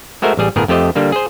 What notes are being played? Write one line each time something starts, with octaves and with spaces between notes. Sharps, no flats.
G#3 A3 F#4 A#4 C5 E5
A1 G3 G#4
G1 A2 B3 G#4 A#4
F2 A3 G4 C5 D#5
D3 G3 A#3
G#4 C5